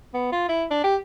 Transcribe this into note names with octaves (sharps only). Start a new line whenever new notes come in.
B3
F4
E4
D4
G4